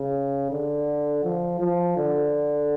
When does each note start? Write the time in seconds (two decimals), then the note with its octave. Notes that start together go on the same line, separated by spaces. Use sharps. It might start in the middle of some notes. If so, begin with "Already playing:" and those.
Already playing: C#3
0.51 D3
1.24 F3
1.60 F3
1.97 D3